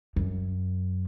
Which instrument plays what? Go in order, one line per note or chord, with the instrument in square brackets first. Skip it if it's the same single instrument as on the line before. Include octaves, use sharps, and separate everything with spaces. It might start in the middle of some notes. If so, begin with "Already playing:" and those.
[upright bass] F#2